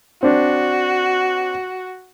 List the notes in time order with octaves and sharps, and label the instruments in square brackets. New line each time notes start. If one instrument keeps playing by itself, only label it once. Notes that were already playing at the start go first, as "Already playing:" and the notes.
[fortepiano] C4 D4 [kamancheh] F#4